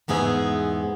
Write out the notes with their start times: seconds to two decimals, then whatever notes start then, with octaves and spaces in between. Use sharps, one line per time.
0.08 E2 G#2 B3 G#4 E5